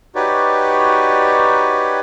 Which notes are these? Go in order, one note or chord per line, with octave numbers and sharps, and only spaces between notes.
D#4 F#4 G4 B4 C#5 D5